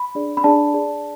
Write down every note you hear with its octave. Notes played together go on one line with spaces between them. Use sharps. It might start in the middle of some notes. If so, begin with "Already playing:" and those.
Already playing: B5
D4 G#4 D5
B5
D4 G#4 D5 A5
G#4 D5